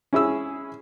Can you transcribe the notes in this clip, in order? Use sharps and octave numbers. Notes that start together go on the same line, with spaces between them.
C#4 E4 G#4 E6